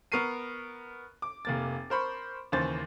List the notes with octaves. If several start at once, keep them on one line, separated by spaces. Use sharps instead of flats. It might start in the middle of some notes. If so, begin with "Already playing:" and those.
B3 A#4 C#6 C7 D#7
D6
F1 A#3 A6
A#4 C5 B5 C#6
D#2 C#3 E3 C5 A6